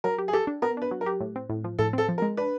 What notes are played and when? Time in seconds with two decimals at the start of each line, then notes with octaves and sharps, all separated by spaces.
0.04 F#3 A#4
0.18 G4
0.28 G#4
0.33 G4 A4
0.47 D4
0.62 B3 A#4
0.77 D4 B4
0.91 F#3
1.01 A#4
1.06 G4
1.21 A2
1.36 C4
1.50 A2
1.64 F3
1.79 A2 A4
1.93 C4 A4
2.09 F3
2.18 A#4
2.22 G#3
2.37 D4 B4